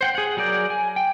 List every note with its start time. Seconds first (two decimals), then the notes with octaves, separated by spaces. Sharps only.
0.01 C5 F#5 G5
0.15 G#4 F#5
0.37 F#3 G#4 A#4 D5 G6
0.70 G#5
0.96 G5